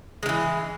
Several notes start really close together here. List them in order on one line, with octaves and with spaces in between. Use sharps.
G#3 D#3 E3